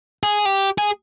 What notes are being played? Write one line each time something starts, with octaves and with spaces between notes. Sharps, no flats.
G#4
G4
G#4